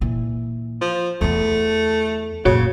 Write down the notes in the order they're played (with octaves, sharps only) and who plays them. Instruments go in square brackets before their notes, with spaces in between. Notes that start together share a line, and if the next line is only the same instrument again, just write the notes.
[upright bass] A#2 E3
[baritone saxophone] F3
[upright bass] E2 E3 [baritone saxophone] A3
[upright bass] F#2 A#2 [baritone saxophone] C#3 [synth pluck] F#4 C#5